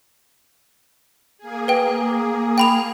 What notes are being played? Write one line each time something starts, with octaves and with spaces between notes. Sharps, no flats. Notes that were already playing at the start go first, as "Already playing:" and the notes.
A#3 G#4
B4 G5
G5 B5 F7